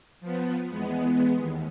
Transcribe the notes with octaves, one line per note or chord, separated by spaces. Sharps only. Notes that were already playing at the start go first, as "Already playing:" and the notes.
F3 B3
E2 G#3 B3
D#2